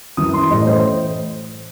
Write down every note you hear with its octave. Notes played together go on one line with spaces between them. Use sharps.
F#2 E3 D#6
C6
A2 E3 D#5
C5